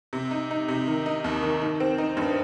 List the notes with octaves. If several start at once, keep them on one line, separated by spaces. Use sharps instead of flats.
C3
D#4
D#4
C3
D#3
D#4
D#2
D#3
D#3
C4
D#4
G2